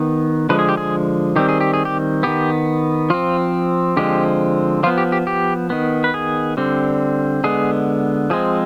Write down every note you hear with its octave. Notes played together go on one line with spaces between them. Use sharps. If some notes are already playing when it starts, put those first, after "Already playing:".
Already playing: D#3 B3
D3 F3 G#3 B4
G#4
G4
G#4
D#3 G3 C4 G4
G#4
G4
G#4
G4
D#3 B3 G4
F3 C4 F4
D3 F3 G#3 C4 G4
F3 B3 F4
G4
G4
G4
D#3 B3
B4
G#4
D3 G3 C4
D3 G#3 B3 G#4
F3 G#3 C4 G#4